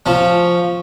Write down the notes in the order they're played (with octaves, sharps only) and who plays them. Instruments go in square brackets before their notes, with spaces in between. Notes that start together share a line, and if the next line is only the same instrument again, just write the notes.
[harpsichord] F3 C#4